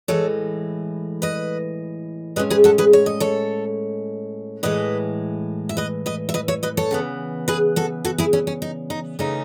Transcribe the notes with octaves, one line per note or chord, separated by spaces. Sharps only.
A2 E3 G#3 A4 C#5
B4 D#5
A2 G#3 C#4 B4 D#5
G#4 B4
F#4 A4
G#4 B4
C#5
D#5
A4 C#5
A2 E3 G#3 B4 D#5
E5
B4 D#5
B4 D#5
E5
B4 D#5
C#5 E5
B4 D#5
A4 C#5
C#3 E3 B3
G#4 B4
F#4 A4
F#4 A4
E4 G#4
C#4 E4
C#4
D#4
D#4
C#3 E3 A3 C#4 D#4